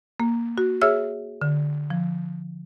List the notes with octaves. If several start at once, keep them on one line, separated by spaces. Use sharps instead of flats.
A#3
F#4
G#4 C#5 E5 E6 F6
D3
F3